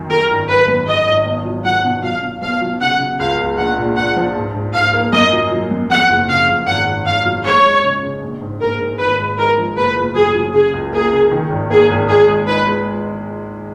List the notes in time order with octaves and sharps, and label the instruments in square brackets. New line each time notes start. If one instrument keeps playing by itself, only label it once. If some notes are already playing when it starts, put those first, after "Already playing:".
Already playing: [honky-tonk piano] F#2 D#3
[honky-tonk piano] F#3 [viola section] A#4
[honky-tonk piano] G#1
[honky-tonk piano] G#1 [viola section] B4
[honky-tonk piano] F#2
[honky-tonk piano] G#1 [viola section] D#5
[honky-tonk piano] G#1
B1
F#3
[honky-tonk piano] F#3 [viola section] F#5
[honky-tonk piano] B2
[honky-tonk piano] F#3 [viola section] F5
[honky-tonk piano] B2
[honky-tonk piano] B1 [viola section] F5
[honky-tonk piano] F#3
[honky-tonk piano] C#3 [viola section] F#5
[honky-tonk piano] C#3
[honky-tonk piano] C#2 [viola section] F5
[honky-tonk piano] C#2
[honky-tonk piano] A#1 [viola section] F#5
[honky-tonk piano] A#2
[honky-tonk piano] A#2 [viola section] F#5
[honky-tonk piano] F3
G#2
G#2
[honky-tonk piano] G#2 [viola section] F5
[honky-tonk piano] A#3
[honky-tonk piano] F#2 [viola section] D#5
[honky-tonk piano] F#3
F#3
F#2
[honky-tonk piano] F2 [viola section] F#5
[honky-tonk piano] F#1
[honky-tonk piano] C#3 [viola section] F5
[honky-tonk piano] F#1
[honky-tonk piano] G#1 [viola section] F#5
[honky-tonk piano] G#1
[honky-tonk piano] G#1 [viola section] F5
[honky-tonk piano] F#3
[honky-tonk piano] G#3 [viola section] C#5
[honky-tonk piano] G#3
C#3
C#3
A#1
G#2
[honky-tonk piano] G#2 [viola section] A#4
[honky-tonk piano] G#2
[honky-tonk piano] G#1 [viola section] B4
[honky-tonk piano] G#3
[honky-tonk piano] G#3 [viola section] A#4
[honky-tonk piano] F3
[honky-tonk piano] F#1 [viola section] B4
[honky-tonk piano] F#1
[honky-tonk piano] F#3 [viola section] G#4
[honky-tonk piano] F#3
[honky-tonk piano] C#3 [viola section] G#4
[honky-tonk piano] C#2
[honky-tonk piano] A#3 [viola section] G#4
[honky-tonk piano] C#3
D#3
G#1
[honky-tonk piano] A#3 [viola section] G#4
[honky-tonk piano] G#1
[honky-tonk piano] G#3 [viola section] G#4
[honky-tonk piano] G#3
[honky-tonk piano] D#4 [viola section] B4
[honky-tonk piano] G#3